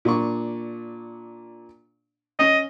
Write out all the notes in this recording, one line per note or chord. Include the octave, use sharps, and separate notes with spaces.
A#2 D4 C#6
C#4 D#5